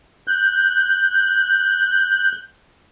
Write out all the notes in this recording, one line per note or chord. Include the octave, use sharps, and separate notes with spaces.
F#6 G6